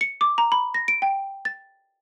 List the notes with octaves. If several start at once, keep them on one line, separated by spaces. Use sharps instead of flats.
C#7
D6
A#5
B5
A#6
D7
G5
A6